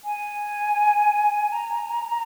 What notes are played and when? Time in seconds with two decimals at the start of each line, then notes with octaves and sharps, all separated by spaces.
0.04 G#5
1.52 A#5